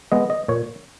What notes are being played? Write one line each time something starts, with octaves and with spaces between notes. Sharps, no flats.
G#3 B3 D#5
D#5
A#2 C#5